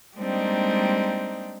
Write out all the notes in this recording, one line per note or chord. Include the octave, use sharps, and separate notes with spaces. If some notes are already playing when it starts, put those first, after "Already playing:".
G3 G#3 A#3 C4 D4 D#4